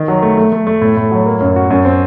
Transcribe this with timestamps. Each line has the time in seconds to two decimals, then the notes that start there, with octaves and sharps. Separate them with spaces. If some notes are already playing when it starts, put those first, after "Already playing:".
Already playing: D#3
0.08 F#3
0.22 A3
0.37 A3
0.52 A3
0.67 A3
0.81 A2
0.97 A2
1.11 F#3
1.26 A#3
1.40 F#2
1.56 F#4
1.70 F#2
1.85 C4